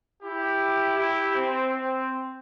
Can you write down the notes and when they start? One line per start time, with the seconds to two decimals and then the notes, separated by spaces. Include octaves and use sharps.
0.23 E4 G4
0.97 E4 G4
1.35 C4
1.71 C4